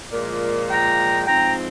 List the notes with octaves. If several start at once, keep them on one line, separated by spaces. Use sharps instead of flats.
A#2 F3 G#3 A#4 D5
G5 A#5
G#2 F3 C4 G5 A#5